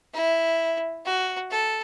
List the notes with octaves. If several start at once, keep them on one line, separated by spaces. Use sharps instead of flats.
E4
F#4
A4